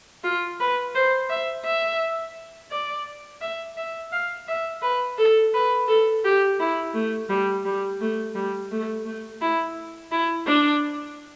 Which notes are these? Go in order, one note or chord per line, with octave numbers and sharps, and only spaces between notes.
F4
B4
C5
E5
E5
D5
E5
E5
F5
E5
B4
A4
B4
A4
G4
E4
A3
G3
G3
A3
G3
A3
A3
E4
E4
D4